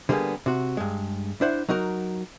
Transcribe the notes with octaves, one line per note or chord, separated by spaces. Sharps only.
D3 G3 A#3 B3 G#4
C3 F#4
G2 G#3
D4 E4 C5 F#5
F#3 D#4 F#4 A#4